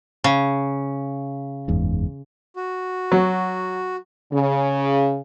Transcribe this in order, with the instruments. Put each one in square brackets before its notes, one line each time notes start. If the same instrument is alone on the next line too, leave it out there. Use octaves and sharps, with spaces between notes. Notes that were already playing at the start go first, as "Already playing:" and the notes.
[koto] C#3
[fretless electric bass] F#1 E2 G#2
[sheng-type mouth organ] F#4
[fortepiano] F#3
[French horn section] C#3